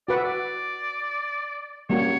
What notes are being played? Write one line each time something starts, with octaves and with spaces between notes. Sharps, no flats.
F#4 B4 D5 F#5
E5
D5
G3 A#3 C#4 F#4 C#5